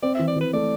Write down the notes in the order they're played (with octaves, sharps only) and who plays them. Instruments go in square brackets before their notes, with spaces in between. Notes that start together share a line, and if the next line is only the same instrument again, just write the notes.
[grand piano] C4 [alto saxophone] D5
[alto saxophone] E5
[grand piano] E3
[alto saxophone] D5
[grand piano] E3 [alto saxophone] B4
[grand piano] A3 [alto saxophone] D5